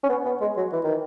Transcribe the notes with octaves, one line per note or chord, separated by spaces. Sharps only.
C#4
B3
B3
G#3
F#3
E3
D#3